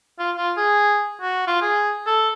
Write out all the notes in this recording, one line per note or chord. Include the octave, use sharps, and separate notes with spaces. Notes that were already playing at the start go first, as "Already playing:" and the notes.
F4
F4
G#4
F#4
F4
G#4
A4